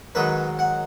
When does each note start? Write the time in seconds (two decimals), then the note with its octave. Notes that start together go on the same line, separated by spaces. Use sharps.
0.15 G#2 D#3 F#3 B4
0.59 F#5